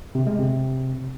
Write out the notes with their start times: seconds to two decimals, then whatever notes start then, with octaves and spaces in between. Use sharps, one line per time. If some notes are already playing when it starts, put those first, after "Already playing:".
0.15 C3
0.27 G#3
0.38 C3